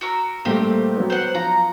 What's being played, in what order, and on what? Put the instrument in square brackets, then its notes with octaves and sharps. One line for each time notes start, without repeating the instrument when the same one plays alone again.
[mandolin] F#4 A#4 E6
[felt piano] A#2 G3 A3 [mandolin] C4 G4
[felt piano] F#3 B3
[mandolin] C5 F#5
[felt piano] F3 [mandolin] A#5